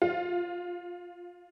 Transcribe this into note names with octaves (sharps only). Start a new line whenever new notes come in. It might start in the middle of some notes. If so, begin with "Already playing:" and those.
F4